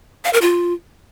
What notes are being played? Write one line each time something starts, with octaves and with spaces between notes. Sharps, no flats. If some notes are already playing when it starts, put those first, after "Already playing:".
F5
A#4
F4